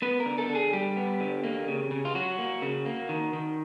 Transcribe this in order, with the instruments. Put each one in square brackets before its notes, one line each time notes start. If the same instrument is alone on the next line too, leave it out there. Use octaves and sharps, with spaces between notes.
[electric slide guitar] B3 B4
A#4
D3
A4
D3
G#4
G3 G4
B3
D3
A#3
C#3
C#3
F4
F#3 F#4
A#3
C#3
A#3
D#3
D#3